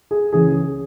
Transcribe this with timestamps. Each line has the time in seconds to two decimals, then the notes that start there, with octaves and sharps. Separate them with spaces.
0.11 G#4
0.33 C#3 E3 G#4